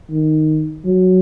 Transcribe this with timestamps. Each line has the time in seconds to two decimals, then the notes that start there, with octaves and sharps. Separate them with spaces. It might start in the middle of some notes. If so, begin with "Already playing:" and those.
0.11 D#3
0.85 F#3